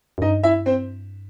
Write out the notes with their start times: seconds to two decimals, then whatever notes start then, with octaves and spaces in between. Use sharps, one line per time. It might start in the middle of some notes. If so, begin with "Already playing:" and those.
0.18 F#2
0.22 G2 D#4 D#5
0.43 E4 E5
0.66 C4 C5